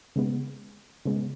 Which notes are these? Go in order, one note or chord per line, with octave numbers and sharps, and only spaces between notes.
C#3 G#3 B3
C#3 G#3 B3